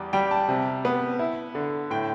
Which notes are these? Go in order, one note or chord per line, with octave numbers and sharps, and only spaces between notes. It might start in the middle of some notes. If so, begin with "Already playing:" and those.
Already playing: E2 G3 D5
G3 G5
A5
C3
B3
E4
D3
A2 G5